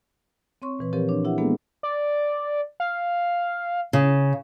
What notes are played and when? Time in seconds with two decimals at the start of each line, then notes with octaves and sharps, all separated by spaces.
0.62 C4 C#5 C6 C#6
0.79 A#2 E3 B4
0.93 F3 C4 G4 A#4 B4 C#5
1.09 D4 C#5
1.25 E4 G4 E5 F#5
1.38 G#3 A#3 B3 D4 G#4 A4
1.83 D5
2.80 F5
3.93 C#3